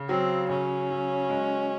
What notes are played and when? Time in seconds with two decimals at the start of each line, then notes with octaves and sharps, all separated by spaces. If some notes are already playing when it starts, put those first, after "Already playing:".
Already playing: C#3
0.09 F#3 C4
0.49 C#3 C#4
0.90 F#3
1.30 G#3